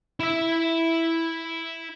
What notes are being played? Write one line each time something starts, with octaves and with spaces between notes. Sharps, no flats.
E4 E5